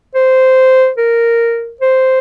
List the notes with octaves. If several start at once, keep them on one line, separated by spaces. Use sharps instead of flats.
C5
A#4
C5